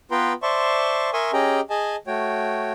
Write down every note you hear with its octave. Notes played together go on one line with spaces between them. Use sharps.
B3 F4 B4 G5 A#5 C6
C5 D5 E5 A5 C6 C#6
A#4 E5 G#5 C6 C#6 D#6
C#4 G4 G#4 D#5 G5 A#5
G#4 D#5 G#5 A5
A3 F#4 C#5 G5